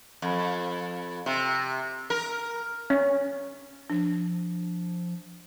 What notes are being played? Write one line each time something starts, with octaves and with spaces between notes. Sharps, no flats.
F2
C3
A#4
C#4
F3 D4